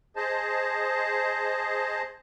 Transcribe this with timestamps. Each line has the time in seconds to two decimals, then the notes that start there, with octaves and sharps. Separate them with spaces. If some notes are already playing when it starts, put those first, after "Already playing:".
0.16 G#4 C5 D#5 A5